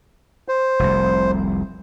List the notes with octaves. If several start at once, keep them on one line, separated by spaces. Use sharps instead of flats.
C5
F1 C2